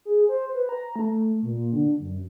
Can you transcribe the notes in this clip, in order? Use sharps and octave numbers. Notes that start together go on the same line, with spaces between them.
G#4
C5
B4
A#5
A3
A#2
D3
F#2